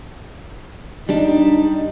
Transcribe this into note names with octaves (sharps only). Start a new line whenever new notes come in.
G3 D4 D#4